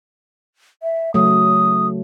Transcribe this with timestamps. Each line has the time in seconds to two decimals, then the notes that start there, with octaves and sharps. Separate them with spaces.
0.83 E5
1.14 C#3 F#3 A3 D#6